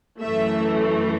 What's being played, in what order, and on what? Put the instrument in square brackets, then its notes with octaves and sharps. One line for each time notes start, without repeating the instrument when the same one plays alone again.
[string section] F#2 E3 A3 E5